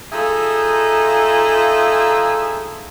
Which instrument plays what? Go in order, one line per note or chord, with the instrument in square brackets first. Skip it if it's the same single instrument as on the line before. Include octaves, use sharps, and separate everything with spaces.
[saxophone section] D#4 F4 G#4 A4 E5